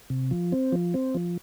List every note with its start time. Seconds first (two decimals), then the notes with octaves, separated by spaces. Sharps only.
0.10 C3
0.31 F3
0.52 C4
0.72 F3
0.94 C4
1.15 F3